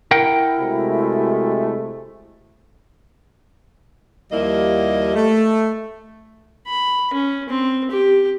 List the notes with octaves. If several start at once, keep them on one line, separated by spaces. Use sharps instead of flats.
E4 A#4 F#5 G5
C3 G#3 A3 F#4
D#2 F3 G3 A#3 E4 D#5
A3
B5
C#4
C4
G4